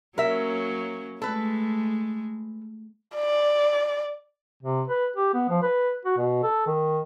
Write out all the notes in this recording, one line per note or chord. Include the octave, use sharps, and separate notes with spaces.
F#3 A#3 C#4 A#4 E5
G#3 A3 A4 B4
D5
C3
B4
G4
B3
F3
B4
F#4
B2
A4
D#3